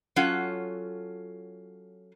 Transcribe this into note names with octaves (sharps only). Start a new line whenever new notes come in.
F#3 C#4 F4 A4 F#5